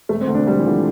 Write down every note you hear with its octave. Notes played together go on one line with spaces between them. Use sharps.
E1 A3
C4
D2 D3
D4
E1 G3
E3
D3 F3